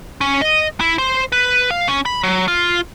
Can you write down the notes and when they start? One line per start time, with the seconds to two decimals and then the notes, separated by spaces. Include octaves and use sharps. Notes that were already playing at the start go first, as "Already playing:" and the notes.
0.21 C#4
0.42 D#5
0.80 E4
0.98 C5
1.32 B4
1.71 F5
1.88 C#4
2.06 B5
2.23 F#3
2.48 F4